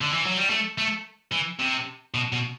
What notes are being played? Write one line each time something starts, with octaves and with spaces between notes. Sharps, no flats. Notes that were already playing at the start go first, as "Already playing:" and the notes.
D3
E3
F#3
G3
A3
A3
E3
C3
B2
B2